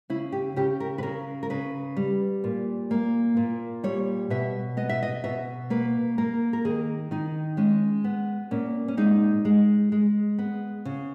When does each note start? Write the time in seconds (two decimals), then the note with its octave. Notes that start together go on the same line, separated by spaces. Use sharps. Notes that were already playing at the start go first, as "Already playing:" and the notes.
0.10 C#3 E4
0.32 G4
0.56 C#3 G4
0.80 A#4
0.98 B4
1.03 C#3 A#4
1.43 A#4
1.50 C#3 B4
1.97 G3
2.44 A#2
2.91 A#3
3.37 A#2
3.84 G3 C#5
4.30 B2 E5
4.77 B3 D#5
4.89 E5
5.03 D#5
5.24 B2 E5
5.70 A#3 B4
6.18 A#3 A#4
6.53 A#4
6.65 D#3 G#4
7.11 D#3 D#4
7.57 G#3 C#4
8.04 B3
8.51 A#2 C#4
8.88 C#4
8.97 G#3 D#4
9.45 G#3
9.92 G#3
10.39 B3
10.85 C#3